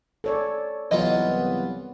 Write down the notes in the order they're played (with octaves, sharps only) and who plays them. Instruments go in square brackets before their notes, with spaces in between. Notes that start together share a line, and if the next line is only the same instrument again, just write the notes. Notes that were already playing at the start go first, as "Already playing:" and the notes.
[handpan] A4 C#5 D5
[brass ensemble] C2 B3 [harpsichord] E3 F#3 F4 [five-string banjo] D#5